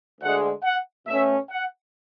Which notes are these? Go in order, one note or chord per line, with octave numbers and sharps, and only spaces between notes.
D2 D3 G#3 F#5
F#5
B2 A3 C#4 E5
F#5